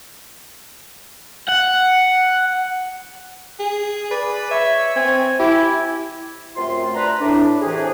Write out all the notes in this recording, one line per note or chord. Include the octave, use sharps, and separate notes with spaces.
F#5
G#4
B4 D5
C#5 E5
C4 G#5
E4 G4
F#2 C3 A3 F4 C6
D4 B4 A#5
A2 D4
A2 C3 E3 G4 G#4